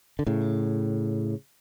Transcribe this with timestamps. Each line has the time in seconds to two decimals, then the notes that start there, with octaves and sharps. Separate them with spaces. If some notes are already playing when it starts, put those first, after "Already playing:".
0.19 D3
0.27 A2 C#3